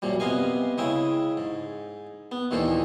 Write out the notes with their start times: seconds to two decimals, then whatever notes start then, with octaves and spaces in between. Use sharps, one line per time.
0.02 F#2 A#2 F3 G3
0.20 C3 B3 D#5 F5 G#5
0.78 C#3 G#3 E4 E5 G5
1.37 G#2
2.32 B3
2.51 D#2 A#2 D#3 E3 A4 C5